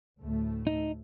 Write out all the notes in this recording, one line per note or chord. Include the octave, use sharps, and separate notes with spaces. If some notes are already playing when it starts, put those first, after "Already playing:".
D2 A2 A3
D#4